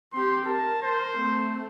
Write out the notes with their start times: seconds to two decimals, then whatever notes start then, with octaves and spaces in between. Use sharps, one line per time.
0.13 C4 G4 C6
0.46 A#4 A5
0.82 C5
1.15 A3 C4